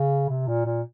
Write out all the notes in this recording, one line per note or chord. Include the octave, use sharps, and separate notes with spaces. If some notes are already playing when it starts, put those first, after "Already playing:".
Already playing: C#3
C3
A#2
A#2